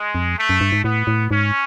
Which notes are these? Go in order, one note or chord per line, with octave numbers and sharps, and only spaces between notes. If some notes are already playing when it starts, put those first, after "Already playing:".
Already playing: G#3
F2
A3
F#2
G2
G#2
A2 B3
A2
G#2 C#4